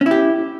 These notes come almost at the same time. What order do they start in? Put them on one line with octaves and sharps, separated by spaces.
C#4 E4 G4